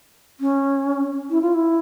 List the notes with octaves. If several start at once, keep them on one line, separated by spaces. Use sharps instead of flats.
C#4
E4
F4
E4